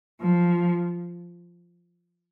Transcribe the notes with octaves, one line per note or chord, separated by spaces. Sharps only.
F3